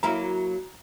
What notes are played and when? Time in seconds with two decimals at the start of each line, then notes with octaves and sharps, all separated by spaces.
0.03 F#3 A#3 E4 A#5